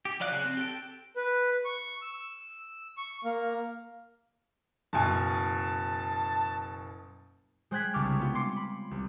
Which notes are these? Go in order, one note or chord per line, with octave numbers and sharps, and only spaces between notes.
G4
F3 F#3 D5 F5 F#6
C#3 G#5 F#6
C4 F#6
G4 A4 G5
B4
C#6
E6
C#6
A#3
F#1 B2 G#5 A5
G#3 C5 G5 F#6 G#6 B6
C2 C#3 D4 C#6 D6 F6
B3 D4 F4
C6 D6 C7 C#7
B5
C2